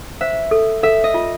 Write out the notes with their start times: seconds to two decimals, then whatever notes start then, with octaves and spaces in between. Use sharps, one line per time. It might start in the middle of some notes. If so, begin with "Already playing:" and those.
0.21 C5 E5
0.51 A4
0.83 A4 E5
1.04 D#5
1.14 F4